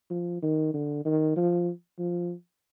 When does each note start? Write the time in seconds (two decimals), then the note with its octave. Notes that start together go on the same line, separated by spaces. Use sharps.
0.10 F3
0.42 D#3
0.74 D3
1.05 D#3
1.36 F3
1.99 F3